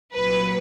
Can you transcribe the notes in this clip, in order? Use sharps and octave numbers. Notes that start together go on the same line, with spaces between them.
C2 A#2 F#3 B4